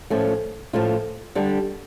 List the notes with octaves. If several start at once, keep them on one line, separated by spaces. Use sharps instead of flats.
A2 F3 A3 C#4 F4
A2 F3 A3 C#4 F4
D3 G3 D4 G4